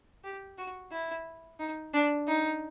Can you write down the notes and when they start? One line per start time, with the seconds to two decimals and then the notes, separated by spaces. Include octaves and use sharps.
0.24 G4
0.58 F#4
0.92 E4
1.59 D#4
1.94 D4
2.27 D#4